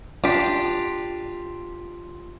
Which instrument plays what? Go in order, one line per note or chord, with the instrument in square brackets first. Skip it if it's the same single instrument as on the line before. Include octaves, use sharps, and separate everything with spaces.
[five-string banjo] D4 G4 [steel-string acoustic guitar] F4